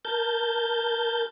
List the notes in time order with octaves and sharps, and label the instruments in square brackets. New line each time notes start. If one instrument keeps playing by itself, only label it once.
[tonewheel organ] A#4 A5 G6